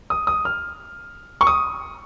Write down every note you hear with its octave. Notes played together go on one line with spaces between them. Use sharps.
D#6
D#6
F6
C#6
D#6